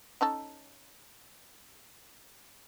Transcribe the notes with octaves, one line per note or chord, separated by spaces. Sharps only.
C#4 D#4 A4